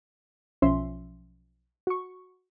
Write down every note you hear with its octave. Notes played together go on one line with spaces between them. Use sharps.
B1 F3 C#4 E5 C6
F#4 C#6